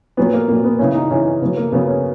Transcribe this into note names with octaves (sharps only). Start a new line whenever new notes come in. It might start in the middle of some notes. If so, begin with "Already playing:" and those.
A#2 F#3 B3
A#3
A#2 F#3 A#3
B3
C#3 E3 C#4
D#4
C#3 E3 C#4
C#3 F#3 B3
A#3
C#3 F#3 B3
C#4